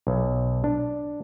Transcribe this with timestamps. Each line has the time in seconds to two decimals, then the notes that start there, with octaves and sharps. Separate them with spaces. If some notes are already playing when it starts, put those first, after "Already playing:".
0.07 B1
0.64 D4